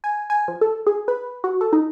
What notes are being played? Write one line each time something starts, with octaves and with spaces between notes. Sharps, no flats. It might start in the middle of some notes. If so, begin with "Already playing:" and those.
G#5
G#5
F3
A4
G#4
B4
F#4
A4
D#4